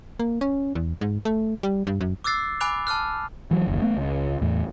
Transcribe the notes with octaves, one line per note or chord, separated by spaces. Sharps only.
A#3
C#4
E2
G#2
A3
G3
G2
F#2
D6 E6 F#6 A6 C7
G#5 B5 D6 F#6 F7
A5 D6 F6 F#6
E3 F#3
F#1 D#2
A3 B3
C#2
E2 A2